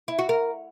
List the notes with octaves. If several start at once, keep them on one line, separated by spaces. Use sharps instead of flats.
E4
F#4
A#4